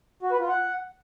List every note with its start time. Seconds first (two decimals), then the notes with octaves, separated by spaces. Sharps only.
0.23 F#4
0.31 B4
0.40 F4
0.49 F#5